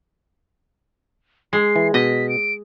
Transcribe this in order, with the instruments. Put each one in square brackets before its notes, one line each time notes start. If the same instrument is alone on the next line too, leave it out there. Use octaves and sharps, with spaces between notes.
[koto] G#3 [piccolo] C7
[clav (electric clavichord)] E3
[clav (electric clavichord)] B2 [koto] D#5 [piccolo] B6
[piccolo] D7